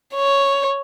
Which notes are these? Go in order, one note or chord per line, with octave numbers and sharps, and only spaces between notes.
C#5